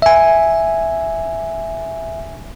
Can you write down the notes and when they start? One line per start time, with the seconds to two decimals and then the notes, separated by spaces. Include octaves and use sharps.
0.02 E5 G#5